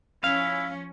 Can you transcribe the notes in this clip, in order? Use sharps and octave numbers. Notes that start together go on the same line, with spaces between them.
F3 C#4 E4 F5